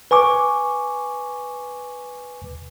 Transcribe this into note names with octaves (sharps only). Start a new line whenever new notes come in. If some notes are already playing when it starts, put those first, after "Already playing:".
B4 G#5 C#6 D6